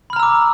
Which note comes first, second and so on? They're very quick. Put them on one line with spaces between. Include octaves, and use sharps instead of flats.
B5 F6 A#5 E6 D6